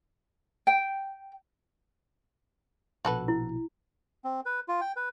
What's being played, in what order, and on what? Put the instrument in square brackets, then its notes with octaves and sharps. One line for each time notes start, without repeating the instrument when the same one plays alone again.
[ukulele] G5
[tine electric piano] A#1 B2 [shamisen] F#4 A4 B4
[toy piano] E4
[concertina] C4
B4
F4
G5
B4